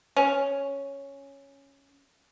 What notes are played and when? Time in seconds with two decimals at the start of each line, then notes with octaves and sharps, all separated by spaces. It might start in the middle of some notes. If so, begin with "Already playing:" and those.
0.16 C#4